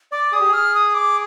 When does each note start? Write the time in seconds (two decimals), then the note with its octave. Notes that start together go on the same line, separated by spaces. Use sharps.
0.12 D5 D6
0.32 G#4 D#6
0.40 G4
0.48 G#4
0.53 F6
0.74 D#6
0.95 D6